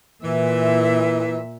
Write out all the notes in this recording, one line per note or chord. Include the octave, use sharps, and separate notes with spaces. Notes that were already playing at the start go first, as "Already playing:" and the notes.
A#2 E3 E5